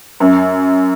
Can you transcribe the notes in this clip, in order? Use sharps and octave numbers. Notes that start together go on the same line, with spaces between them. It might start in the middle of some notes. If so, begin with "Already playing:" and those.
F#2